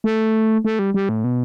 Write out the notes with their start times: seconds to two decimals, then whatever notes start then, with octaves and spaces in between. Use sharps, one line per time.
0.04 A3
0.65 A3
0.79 G3
0.94 G3
1.09 A2
1.24 B2